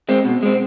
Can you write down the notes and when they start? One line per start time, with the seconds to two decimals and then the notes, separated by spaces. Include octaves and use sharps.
0.09 G#3 C4
0.25 B2
0.43 G#3 C4